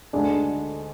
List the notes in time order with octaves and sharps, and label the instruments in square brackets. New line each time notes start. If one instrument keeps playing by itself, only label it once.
[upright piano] D2 D3 G#3 D4 G#4